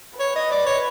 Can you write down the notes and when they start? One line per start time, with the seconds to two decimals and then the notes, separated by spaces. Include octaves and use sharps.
0.19 B4 C#5
0.36 D#5
0.51 D5
0.66 C#5